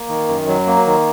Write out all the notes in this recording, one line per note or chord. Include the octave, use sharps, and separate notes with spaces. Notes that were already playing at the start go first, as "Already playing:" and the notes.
Already playing: A#3
D#3
F#2
F#3
A#3
D#3